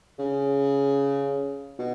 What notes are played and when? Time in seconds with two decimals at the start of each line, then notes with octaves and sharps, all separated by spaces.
0.19 C#3
1.79 B2